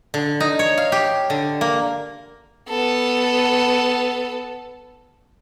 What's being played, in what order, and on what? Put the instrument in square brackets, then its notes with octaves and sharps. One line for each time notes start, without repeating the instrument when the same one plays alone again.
[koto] D3
D#4
C#5
F5
G4
D3
A#3
[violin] B3 A4